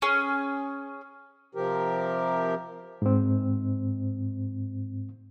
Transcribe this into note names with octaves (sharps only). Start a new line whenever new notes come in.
C#4 G#4
C3 F3 G4 A#4
G#2 C4